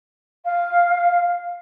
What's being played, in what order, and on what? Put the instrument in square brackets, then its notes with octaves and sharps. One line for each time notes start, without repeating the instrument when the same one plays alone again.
[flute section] F5